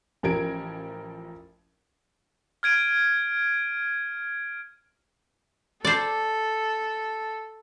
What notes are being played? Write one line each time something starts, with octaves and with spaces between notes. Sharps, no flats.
A1 F3 A#4 G#6 D7
F6 G#6 D7 D#7
A4 C5 D5